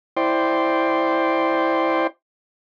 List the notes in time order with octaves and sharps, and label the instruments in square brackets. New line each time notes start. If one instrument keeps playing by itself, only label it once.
[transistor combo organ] E4 C5 D5 G5 C6